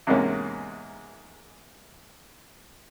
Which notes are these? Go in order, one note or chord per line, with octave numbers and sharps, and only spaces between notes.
E2 G#2 C3 G#3 A#3 C#4